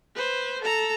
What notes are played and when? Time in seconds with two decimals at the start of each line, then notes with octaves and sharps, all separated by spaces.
0.15 B4 C5
0.62 A4 A#5